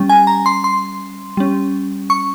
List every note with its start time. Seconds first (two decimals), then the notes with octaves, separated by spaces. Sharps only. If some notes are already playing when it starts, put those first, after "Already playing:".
Already playing: G3 C#4
0.09 G#5
0.27 A#5
0.46 C6
0.64 C6
1.37 G3 C#4
2.10 C#6